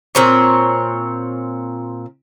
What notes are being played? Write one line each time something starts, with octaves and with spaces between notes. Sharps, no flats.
A#2 C4 C#5